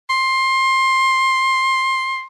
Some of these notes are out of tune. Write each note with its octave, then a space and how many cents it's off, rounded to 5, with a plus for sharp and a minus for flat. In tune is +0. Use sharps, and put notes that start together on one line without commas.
C6 +20